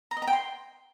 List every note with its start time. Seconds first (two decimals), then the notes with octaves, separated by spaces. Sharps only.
0.11 A#5
0.17 D#5
0.22 A#5
0.27 G5
0.33 C6